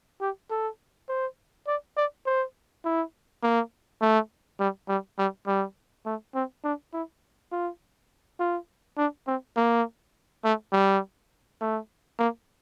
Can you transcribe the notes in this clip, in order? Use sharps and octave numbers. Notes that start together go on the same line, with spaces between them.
G4
A4
C5
D5
D5
C5
E4
A#3
A3
G3
G3
G3
G3
A3
C4
D4
E4
F4
F4
D4
C4
A#3
A3
G3
A3
A#3